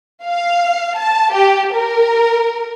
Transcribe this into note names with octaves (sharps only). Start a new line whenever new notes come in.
F5
A5
G4
A#4